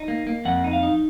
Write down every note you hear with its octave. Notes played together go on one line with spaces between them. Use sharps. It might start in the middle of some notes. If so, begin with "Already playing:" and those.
Already playing: D#4
A#3
A#3
F2 F#5
D#4
F5
D#4